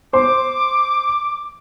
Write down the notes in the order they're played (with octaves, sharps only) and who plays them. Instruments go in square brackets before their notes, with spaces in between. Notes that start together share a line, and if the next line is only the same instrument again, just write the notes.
[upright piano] C5 C6 [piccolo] D6